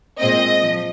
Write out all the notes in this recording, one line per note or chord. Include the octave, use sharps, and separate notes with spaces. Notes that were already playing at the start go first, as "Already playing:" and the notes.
A#2 G#3 C4 D#5
F3